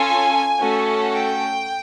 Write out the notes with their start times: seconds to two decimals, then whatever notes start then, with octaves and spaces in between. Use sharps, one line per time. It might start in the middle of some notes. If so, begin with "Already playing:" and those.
Already playing: C#4 F4 A4 G#5
0.60 A3 C#4 F#4 A4
1.11 G5